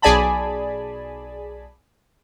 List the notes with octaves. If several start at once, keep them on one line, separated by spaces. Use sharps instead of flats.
B1 G#4 D5 G#5 A5 B5